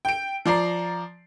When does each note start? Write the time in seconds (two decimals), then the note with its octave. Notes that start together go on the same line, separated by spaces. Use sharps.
0.05 G5 D7
0.46 F3 D5 A#5 C7